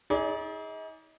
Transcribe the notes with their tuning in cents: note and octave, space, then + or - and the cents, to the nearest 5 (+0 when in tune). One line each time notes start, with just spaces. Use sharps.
D#4 +40 G#4 +0 D5 -25